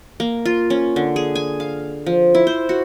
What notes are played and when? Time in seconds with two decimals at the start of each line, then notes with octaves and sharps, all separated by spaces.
0.20 A#3
0.45 F4
0.70 C#4
0.96 D3
1.16 G#4
1.35 G#5
1.60 F5
2.06 F3
2.35 E4
2.47 C5
2.69 F#4